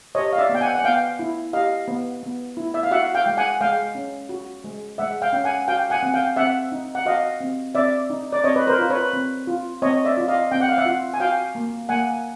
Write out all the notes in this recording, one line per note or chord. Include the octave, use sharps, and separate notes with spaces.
G4 C#5 D#5
F5
D5 E5
B3
G5
F#5 G#5
F#5
B3 F5 G5
E4
G4 D#5 F5
B3
B3
E4
E5
F5
F#4 E5 F#5
F5 G5
G#3
F#5 G#5
G#3 F5 G5
C#4
F#4
G#3
G#3 E5 F#5
F5 G5
C#4
F#5 G#5
F#4 F5 G5
F#5 G#5
C4 F#5
F5 G5
C4 E5 F#5
D#4
F#5
F#4 D#5 F5
C4
C4 D5 E5
D#4
D5
C4 C#5 D#5
B4
A#4 C5
F4
B4 C#5
C4
F4
C4 C#5 D#5
D5 E5
F4
D#5 F5
C4 G5
F#5
F5
E5 F#5
F4
G#5
F#4 F5 G5
A#3
A#3 F#5 G#5